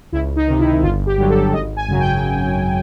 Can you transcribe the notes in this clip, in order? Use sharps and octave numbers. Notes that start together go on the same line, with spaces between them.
C#2 E4
D#4
C3 D#3
E4
G1 F4
G4
G2 D3 F#3
A4
G#1 D#5
G#5
F#2 C#3 F#3
G5